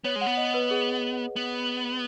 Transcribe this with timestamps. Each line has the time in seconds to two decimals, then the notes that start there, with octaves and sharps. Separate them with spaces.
0.04 B3 C#5
0.16 G#3
0.21 F#5
0.26 B3
0.37 D#5
0.54 B4
0.71 G#4
1.36 B3